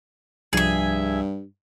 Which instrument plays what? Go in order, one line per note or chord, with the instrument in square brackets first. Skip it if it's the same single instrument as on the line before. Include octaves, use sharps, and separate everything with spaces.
[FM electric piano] C2 F3 [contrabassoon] G2 [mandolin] G#4 E5